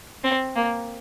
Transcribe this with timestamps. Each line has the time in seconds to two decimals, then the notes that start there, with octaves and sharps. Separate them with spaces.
0.24 C4
0.55 A#3